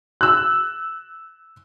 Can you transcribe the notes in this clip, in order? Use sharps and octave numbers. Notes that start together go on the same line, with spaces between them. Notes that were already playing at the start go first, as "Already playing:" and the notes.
E6 F#6